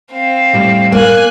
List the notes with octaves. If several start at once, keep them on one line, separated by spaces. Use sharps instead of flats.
C4 F5
A2 G3
A#3 G#5 F#6